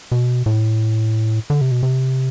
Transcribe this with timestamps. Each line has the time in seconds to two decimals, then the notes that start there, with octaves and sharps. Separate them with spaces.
0.12 B2
0.46 A2
1.50 D3
1.61 C3
1.71 B2
1.83 C3